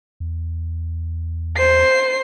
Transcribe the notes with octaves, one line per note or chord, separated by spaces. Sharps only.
E2
C5 C7